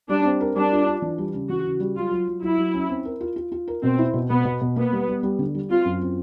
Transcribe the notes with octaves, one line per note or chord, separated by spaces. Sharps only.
G3 D4
C4
A#4
G3 D4
F4
F4
E3
G3
C#3
E3 F#4
C#3
G3
F#3 F4
F#3
F#3
F#3 E4
F#3
C#4
C4
A#4
F4
F4
F4
A#4
B2 C4
E4
B2
B2 B3
B2
B2
A#3 B3
G3
G3
G3
D3
G3
C4 F4
F#2
C4